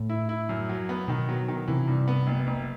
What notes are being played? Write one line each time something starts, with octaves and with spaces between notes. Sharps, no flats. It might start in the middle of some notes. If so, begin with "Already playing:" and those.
Already playing: A2
E4
E4
F#2
F#3
B3
B2 D#3
F#3
D#3
C3 E3
G2
B3
F#1
F#1